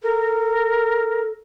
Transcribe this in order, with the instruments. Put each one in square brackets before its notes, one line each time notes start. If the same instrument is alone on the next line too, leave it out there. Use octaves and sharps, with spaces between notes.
[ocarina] A4 [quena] A#4